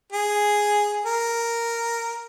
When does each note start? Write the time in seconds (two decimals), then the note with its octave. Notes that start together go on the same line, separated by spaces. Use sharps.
0.12 G#4
1.06 A#4